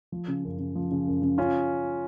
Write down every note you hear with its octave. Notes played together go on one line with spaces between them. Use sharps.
F3
C#3
F#2
C#3
F3
C#3
F#2
C#3
C#4 F4